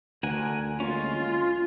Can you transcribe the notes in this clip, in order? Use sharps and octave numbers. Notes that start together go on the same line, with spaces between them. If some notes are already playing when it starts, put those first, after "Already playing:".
D2 A#4 F#5 G#5
G#3 A#3 C#4 F4